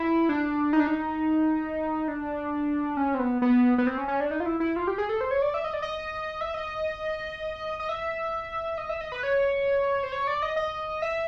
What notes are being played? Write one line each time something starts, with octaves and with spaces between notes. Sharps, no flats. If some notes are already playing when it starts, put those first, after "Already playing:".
Already playing: E4
D4
D#4
D4
D#4
D4
C#4
C4
B3
B3
B3
C4
C#4
C#4
D4
D#4
F4
E4
E4
F4
G4
G#4
A4
C5
C#5
D5
E5
D#5
D5
D#5
E5
D#5
D#5
E5
D#5
E5
D#5
B4
C#5
C5
C#5
D5
D#5
D#5
E5